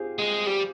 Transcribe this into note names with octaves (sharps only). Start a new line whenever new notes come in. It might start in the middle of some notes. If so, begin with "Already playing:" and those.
Already playing: F4 G4 G#4 C5
G#3
G3